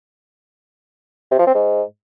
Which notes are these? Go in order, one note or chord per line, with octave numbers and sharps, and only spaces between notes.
C3
F3
C4
G#2